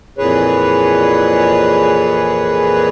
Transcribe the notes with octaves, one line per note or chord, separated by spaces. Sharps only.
F2 A#2 E3 G#4 B4 C#5